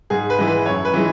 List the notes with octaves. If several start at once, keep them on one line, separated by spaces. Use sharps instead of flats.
G#2 G#4
B4
E3 G#3
B4
F#2 C#5
B4
E3 G#3